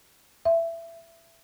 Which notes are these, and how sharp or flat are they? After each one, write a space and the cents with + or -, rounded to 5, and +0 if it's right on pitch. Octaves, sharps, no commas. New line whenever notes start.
E5 +15